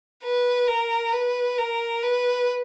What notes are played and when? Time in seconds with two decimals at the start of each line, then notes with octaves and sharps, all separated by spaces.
0.24 B4
0.68 A#4
1.12 B4
1.58 A#4
2.03 B4